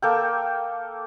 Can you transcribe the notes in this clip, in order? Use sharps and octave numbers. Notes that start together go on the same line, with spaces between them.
A#3 A4 G5